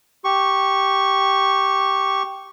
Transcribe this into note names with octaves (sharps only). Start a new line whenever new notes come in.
G4 C#6